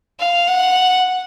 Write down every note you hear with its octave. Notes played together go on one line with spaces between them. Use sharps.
F5
F#5